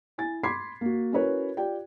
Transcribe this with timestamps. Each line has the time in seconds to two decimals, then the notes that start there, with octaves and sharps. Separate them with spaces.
0.18 E4 G#5 A6
0.43 B5 C6 D6 G#6 B6 C7
0.81 A#3 F#4
1.12 C#4 E4 F#4 A#4 B4 C#5
1.57 F4 G4 D5 G5